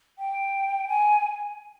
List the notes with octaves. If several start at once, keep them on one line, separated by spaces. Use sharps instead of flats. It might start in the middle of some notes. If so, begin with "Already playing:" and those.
G5
G#5